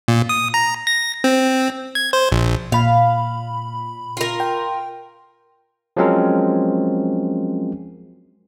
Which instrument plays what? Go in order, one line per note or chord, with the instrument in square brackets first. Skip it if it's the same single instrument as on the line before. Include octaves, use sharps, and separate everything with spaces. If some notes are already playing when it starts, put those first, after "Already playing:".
[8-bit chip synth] A#2
D#6
A#5
A#6
C4
G#6
C5
A#1
[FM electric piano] A#2 B5 [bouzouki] F5
[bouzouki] F4 A#4
[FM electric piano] G5
[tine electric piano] F3 F#3 G#3 C4 C#4 A#4